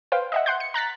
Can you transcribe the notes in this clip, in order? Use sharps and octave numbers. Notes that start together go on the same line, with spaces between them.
B4 C5 F5 G5
D#5 E5 F#5
F#5 C6 G6
C#7
A#5 F#6 A6 B6